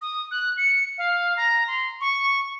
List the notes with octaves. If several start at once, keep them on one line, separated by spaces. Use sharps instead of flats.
D#6
F#6
C#7
F5
A#5
C6
C#6